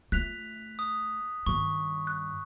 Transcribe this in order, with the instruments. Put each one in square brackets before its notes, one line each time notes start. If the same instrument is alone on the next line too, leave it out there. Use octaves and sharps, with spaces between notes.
[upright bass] A3 F4 [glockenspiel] F#6 B6 F7
[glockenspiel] D#6
[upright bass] G2 D#3 [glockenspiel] C#6
[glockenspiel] F#6